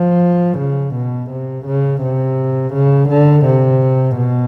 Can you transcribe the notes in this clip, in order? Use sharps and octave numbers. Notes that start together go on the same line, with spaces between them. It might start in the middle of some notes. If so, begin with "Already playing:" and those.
Already playing: F3
C#3
B2
C3
C#3
C3
C#3
D3
C3
B2